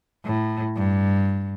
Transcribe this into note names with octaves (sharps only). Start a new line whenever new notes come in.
A2
G2